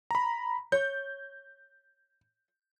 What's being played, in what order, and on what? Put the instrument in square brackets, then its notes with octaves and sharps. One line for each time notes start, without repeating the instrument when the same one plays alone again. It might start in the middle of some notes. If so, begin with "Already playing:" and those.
[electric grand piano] A#5 B5
[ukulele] C#5 [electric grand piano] G6